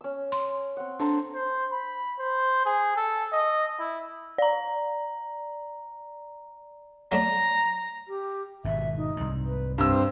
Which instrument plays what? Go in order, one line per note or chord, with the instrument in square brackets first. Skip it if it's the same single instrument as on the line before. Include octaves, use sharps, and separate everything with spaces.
[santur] C#4 E6
[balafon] C6
[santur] C4 F#5
[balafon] D4 [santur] A4 C5 A#5
[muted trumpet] C5
B5
C5
G#4
A4
D#5
E4
[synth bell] D5 A#5
[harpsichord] F#3 A3 D4 [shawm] A#5
[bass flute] G4
[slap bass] G#1 B2 [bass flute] E5
[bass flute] D#4
[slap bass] C2 G#2
[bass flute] B4
[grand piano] G2 E6 [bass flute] C4